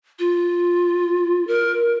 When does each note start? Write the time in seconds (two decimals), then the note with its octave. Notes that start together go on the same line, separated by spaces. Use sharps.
0.19 F4
1.47 A#4